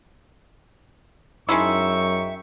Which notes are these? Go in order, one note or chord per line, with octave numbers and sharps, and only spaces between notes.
F#2 G#3 D#4 E4 E5 G5 A#5 C#6